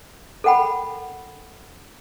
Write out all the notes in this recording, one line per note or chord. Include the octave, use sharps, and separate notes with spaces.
A4 A#4 F#5 G5 B5